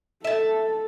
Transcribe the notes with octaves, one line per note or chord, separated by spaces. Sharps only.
A4 E5 A5